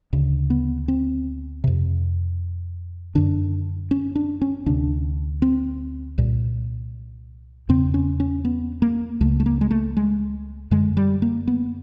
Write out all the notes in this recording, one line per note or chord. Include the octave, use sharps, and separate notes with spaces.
D2 C#3
B3
C4
F2 C3
F#2 D3 D4
C#4
D4
C#4
D2 C3 D4
C4
C2 A#2
E2 C#3 C4
C#4
C#4
B3
A#3
C#2 C#3 A3
A3
A#3
G#3
A3
G#3
F#2 D3 G#3
G3
A#3
B3